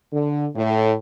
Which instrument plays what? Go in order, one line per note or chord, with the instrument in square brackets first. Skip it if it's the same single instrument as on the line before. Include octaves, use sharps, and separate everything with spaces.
[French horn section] D3
A2